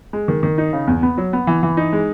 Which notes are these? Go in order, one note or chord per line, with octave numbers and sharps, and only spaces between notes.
G#3
D#3
D#3
D#4
C#3
E2
B3
F#3
B3
E3
E3
D#4
G#3